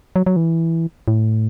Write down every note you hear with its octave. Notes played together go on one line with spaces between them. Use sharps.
F#3
F#3
E3
A2